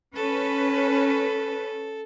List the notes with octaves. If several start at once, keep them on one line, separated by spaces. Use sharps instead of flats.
C#4 A4 B4